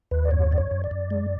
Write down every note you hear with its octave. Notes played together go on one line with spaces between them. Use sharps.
D#2 B4
D5
F#2 C#5
F#2 D5
C#5
F#2
D5
F#2
G#3